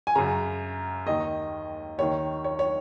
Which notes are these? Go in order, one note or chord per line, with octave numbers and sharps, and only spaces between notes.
G#5
F#2 C#3 A#5
D#2 D#3 D#5
D#2 D#3 C#5
C#5
C#5